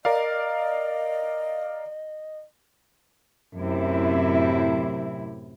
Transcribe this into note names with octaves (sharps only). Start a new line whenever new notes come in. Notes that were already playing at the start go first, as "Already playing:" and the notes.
A#4 D5 D#5 F5
F#2 A2 C3 E4